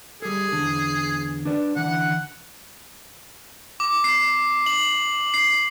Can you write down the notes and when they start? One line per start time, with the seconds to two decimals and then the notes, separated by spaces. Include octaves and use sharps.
0.22 G3 G#4 A4
0.53 E2 D3
1.45 D4 B4 D5
1.76 D3 E3 F#5
3.80 D6
4.04 C7
4.66 F#7
5.34 C7